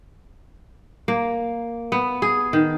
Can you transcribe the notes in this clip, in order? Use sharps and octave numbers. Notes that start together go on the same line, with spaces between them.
A#3
B3
G#4
D#3